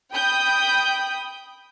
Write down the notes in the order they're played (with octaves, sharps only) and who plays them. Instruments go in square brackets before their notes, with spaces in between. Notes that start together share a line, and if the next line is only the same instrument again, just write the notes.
[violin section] G5 B5 D#6 G6